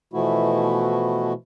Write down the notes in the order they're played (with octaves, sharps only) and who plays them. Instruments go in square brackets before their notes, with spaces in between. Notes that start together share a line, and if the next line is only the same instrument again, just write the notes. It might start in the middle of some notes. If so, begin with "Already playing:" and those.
[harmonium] B2 E3 F3 A3 E4 F#4